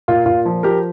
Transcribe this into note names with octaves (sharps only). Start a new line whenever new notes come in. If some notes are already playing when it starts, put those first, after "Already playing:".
A#2 F4
A#2 F4
F3
F3 G4 A#4